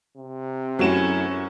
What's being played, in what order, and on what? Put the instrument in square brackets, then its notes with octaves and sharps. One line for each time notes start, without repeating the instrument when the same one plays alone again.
[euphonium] C3
[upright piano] F#2 F#4 E7 [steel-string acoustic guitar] F#3 A3 E4 [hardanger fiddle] C#4